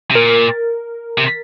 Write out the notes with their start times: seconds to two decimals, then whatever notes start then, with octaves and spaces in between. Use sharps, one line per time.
0.11 C3
0.15 A#2 A#4
1.18 C3